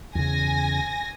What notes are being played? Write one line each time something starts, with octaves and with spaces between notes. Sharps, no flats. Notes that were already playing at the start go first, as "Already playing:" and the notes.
E2 C#3 G#5 A#6